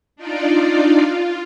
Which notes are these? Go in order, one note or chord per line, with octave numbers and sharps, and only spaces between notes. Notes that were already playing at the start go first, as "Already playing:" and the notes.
D4 D#4 F4 D5
F4